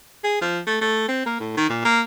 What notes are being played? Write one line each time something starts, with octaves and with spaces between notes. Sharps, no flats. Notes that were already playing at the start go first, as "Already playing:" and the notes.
G#4
F3
A3
A3
C4
A#3
A2
D#3
A#2
A#3